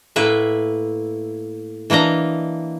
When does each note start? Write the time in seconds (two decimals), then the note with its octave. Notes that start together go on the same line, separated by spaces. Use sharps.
0.16 A2 A#3 B4 E5
1.90 E3 A#3 D4 D#5 A#5